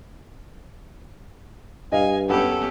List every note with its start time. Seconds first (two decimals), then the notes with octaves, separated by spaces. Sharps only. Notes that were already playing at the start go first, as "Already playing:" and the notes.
1.92 G2 D#5 F5 G#5
2.29 F#2 B3 C#4 G4 A4 B4 F#5